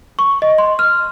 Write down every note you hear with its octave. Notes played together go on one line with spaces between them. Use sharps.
C#6
D#5
C6
F6